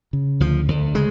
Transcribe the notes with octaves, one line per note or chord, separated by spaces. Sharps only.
C#3
D2 F3
D2
C#3 G#3